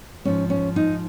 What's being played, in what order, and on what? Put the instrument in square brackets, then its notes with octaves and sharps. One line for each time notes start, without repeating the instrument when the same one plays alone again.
[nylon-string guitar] G#2 F3 C#4
C#4
D#4